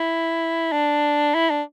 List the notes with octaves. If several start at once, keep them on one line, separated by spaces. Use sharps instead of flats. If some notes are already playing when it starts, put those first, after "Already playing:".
Already playing: E4
D4
E4
D4